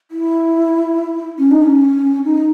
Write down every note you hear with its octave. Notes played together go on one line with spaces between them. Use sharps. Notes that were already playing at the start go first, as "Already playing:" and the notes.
E4
C#4
D#4
C#4
D#4